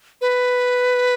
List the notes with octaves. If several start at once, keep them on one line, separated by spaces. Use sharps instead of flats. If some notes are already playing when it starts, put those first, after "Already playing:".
B4